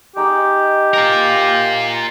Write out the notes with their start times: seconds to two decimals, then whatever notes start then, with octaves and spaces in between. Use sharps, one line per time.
0.16 G#3 D#4 G4 F#5
0.94 F4 A#4